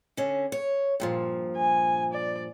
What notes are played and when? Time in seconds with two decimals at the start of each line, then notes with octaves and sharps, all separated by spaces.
0.17 D3 C#4
0.52 C#5
1.00 G2 A#2 F3
1.57 G#5
2.13 D5